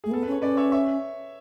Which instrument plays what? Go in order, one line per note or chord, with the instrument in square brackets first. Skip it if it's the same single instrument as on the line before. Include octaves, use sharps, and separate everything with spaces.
[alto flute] A3 [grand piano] G#4
[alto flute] B3 [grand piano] A4
[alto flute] C#4 [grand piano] B4
[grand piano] C#5
[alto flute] C#4 [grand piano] B4 D5
[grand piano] C#5 E5
C#5 E5